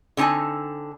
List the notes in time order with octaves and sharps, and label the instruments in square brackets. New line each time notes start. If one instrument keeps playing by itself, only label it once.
[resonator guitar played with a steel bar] D3 C4 D#4 G#5 A5